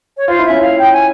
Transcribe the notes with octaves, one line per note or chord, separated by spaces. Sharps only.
C#5
F4 C5
E4
C#4 E5
E4 F5
G5
G#5